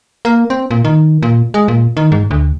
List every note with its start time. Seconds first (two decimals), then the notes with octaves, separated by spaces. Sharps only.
0.25 A#3
0.50 C4
0.71 A#2
0.85 D#3
1.22 A#2
1.54 G#3
1.68 A#2
1.97 D#3
2.12 G#2
2.31 D2